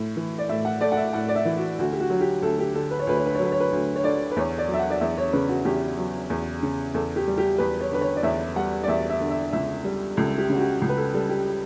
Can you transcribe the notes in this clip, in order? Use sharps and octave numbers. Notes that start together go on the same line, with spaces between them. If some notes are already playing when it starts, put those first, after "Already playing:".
Already playing: A2
E3
D5
A2 E5
F#5
A3 D5
F#5
E5
A2 F#5
D5
E5
E3
F#4
D2 F#4
G4
F#4
F#3
G4
D2 A4
G4
D3 A4
B4
C#5
D2 B4
C#5
B4
C#5
F#3 B4
C#5
B4
D2
C#5
D3 D5
B4
E2 C#5
D5
F#3
E5
F#5
D5
E2 E5
C#5
C#3 B4
F#4
E2 G4
F#3
E2
C#3
E2 A4
G4
G3
G4
E2 B4
C#5
D3 B4
C#5
D5
E2 E5
G3 F#5
D5
E2 E5
E5
D3
E5
C#2 E5
G3
C#2 A4
G4
C#3
F#4
G4
C#2
B4
A4
G3 A4
G4